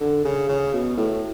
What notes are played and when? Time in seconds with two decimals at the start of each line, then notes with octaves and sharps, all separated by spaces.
0.01 D3
0.25 C#3
0.49 C#3
0.73 B2
0.97 A2